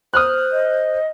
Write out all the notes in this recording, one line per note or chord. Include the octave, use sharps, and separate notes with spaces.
C5 D#6 F6 F#6
D#5